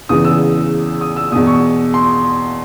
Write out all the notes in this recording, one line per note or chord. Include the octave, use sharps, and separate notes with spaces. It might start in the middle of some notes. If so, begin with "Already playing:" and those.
E2 C#3 E3 D#6
E6
D#6
E6
E2 B2 D#6
C#6
C6